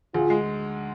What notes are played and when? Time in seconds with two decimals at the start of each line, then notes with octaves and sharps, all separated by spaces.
0.14 D2 F4 G#4
0.30 G#3